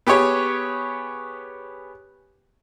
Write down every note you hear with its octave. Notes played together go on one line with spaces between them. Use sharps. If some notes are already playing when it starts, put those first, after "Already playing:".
B3 G4 G#4 C#5